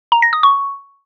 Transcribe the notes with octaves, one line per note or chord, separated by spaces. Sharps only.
A#5
A#6
D#6
C#6